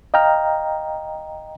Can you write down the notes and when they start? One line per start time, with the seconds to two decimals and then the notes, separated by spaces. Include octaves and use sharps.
0.14 D#5 F5 G5 A#5 F6